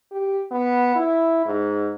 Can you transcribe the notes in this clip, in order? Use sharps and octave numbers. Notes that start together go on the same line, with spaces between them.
G4
B3
E4
G#2